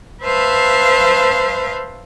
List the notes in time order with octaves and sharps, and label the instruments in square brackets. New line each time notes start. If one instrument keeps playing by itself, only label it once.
[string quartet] B4 C5 E5 F5 A5